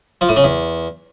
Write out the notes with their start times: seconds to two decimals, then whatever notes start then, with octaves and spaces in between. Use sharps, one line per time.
0.21 F3
0.29 A2
0.36 C#3
0.44 E2